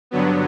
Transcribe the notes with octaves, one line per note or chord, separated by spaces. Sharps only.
G2 D3 F#3 B3